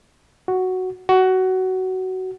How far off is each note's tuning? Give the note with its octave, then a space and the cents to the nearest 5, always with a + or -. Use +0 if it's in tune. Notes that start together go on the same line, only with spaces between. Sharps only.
F#4 +0
F#4 +15